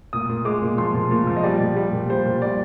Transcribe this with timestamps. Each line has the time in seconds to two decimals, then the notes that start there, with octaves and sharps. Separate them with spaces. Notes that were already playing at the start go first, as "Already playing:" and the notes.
0.13 A#2 D#6
0.29 A#2
0.45 G#3 D6
0.62 A#2
0.78 F3 C6
0.94 A#2
1.11 A#2
1.27 F3
1.36 D#5
1.43 G3 D5
1.60 A#2
1.76 G3
1.92 A#2
2.10 G3 C5
2.25 A#2
2.42 G3 D5